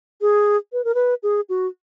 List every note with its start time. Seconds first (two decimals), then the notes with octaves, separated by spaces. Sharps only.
0.21 G#4
0.73 B4
0.84 A#4
0.95 B4
1.23 G#4
1.49 F#4